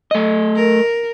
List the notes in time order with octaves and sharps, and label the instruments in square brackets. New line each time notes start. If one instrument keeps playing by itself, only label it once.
[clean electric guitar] A3 D#5
[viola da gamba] A#4